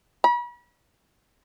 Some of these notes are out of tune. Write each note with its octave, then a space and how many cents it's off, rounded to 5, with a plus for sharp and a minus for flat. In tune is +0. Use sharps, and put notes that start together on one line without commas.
B5 -40